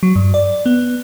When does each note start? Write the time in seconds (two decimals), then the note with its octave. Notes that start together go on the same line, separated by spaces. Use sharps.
0.03 F#3
0.16 G2
0.34 D5
0.66 B3